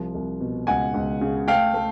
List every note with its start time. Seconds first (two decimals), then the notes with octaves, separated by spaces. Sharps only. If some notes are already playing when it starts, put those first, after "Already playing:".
Already playing: C2 F3
0.15 C2
0.40 B2
0.67 C#2 F#5 G#5
0.94 C#2
1.21 C#3
1.48 A3 F5 G5
1.74 A3